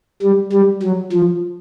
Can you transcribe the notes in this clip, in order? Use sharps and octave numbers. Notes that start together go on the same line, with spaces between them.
G3
G3
F#3
F3